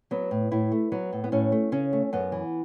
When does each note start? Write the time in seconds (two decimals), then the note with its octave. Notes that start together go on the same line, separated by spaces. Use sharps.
0.11 F#3 B3
0.31 A2
0.52 A2 E4
0.72 A3
0.92 F#3 B3
1.13 A2
1.24 B3
1.32 A2 C#4
1.52 A3
1.72 C#3 C#4
1.93 A3
2.13 F#2 B3
2.32 E3